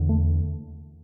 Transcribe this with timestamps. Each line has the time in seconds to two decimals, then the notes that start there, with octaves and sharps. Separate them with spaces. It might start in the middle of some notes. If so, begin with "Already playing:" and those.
Already playing: E2 D3
0.09 A3